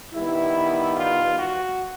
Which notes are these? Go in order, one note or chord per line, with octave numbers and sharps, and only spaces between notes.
D#3 G3 B3 E4
F4
F#4